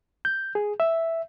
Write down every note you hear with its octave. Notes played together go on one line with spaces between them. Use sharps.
G6
G#4
E5